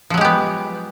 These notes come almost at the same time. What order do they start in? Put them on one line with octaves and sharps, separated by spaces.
F3 F#3 G#3 G4 B3